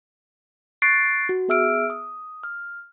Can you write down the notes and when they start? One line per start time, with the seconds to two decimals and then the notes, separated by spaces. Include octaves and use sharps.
0.82 C#6 F#6 A6 C7 D7
1.29 F#4
1.48 B3 G#4 E5 E6 F6 D7
1.90 D#6
2.43 F6